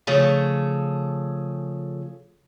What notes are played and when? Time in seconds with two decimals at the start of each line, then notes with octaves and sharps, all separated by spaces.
0.07 C#3 F3 A3 G#4 A4